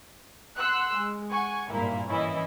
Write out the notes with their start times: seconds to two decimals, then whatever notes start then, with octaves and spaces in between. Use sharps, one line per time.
0.57 F#5 C6 E6 F#6
0.95 G#3
1.30 F#5 G#5 C#6
1.71 G#1 G2 A#2 A#3 E4
2.08 E3 C#4 E4 D#5